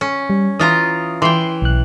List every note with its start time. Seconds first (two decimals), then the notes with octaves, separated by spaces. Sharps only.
0.01 C#4
0.30 G3
0.59 E3 F4 A#5 D#6
1.22 E3 G5 C6 C7
1.62 B1 F#6